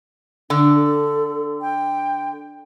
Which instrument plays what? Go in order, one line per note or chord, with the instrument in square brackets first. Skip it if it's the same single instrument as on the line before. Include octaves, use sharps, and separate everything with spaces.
[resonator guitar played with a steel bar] D3 [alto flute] D4
[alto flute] A4
G5